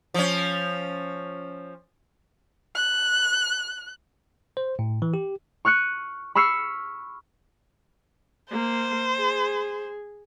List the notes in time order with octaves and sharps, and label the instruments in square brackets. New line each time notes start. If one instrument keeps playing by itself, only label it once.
[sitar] F3 C#4
[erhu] F#6
[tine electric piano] C5
A2
E3
G4
[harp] C#6 F6 F#6 C#7 D#7
B5 C#6 E6 F6 C7 C#7
[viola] A#3 [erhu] C5
[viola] G#4